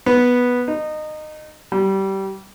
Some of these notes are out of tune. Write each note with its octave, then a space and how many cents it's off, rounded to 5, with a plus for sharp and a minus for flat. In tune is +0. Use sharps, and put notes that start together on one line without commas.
B3 -5
D#4 -20
G3 -20